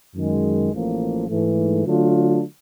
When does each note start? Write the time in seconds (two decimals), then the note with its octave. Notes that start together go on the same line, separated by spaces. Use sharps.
0.14 F#2 D#3 G#3
0.71 A1 A2 F3 A#3
1.28 G#2 E3 A3
1.85 D3 F#3 A3 D4 F4